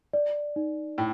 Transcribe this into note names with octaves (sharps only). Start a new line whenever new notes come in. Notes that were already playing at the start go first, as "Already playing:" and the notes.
D5
D#4
A2 G5